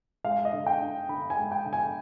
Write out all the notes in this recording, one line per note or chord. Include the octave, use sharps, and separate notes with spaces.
G#3 F5
D#5
D3
G5
D4
D3 B5
G#5
G#3
G5
D3
G#5